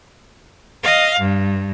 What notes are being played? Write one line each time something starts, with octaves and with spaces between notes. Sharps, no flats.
D#5 F5
G2